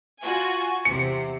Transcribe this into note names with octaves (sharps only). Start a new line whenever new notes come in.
F4 F#4 G#5
E2 C3 C#7